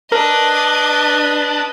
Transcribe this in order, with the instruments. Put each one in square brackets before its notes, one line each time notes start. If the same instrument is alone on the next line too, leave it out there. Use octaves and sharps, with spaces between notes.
[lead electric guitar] D4 [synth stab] A#4 [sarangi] B4 [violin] D#5